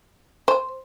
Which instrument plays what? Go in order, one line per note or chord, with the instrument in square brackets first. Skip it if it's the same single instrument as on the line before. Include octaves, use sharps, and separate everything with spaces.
[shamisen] C5